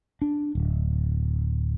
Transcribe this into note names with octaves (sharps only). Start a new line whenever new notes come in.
D4
D1